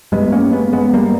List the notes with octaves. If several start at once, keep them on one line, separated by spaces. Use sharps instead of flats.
G2 G#3 B3
A#3 C#4
G#3 B3
G#3 B3
G3 A#3